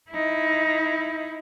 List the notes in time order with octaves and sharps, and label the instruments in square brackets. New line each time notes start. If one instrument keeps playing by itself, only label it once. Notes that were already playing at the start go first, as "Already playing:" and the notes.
[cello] D#4 E4